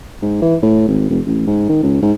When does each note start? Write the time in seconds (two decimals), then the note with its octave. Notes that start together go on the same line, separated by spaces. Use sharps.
0.22 G#2
0.42 E3
0.62 A2
0.88 G#1
1.10 F1
1.26 A1
1.47 G#2
1.69 D#3
1.83 C#2
2.02 G#2